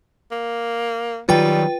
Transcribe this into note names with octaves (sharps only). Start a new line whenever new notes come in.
A#3
D#3 F#3 G3 F4 B4 G5